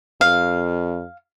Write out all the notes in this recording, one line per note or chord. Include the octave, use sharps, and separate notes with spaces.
F2 F5